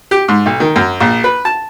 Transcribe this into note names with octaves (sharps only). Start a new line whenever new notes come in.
G4
G#2
B1
D#3
F#2
A#1
B4
A5